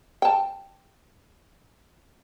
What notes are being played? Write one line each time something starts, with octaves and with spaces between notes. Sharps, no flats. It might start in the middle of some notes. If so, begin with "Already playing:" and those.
G5 A5